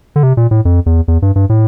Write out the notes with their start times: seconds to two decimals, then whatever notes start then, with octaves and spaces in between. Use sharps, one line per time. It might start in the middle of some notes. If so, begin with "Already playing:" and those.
0.16 D3
0.23 C3
0.37 A#2
0.51 A2
0.65 F2
0.86 E2
1.08 E2
1.22 G2
1.36 G2
1.49 A2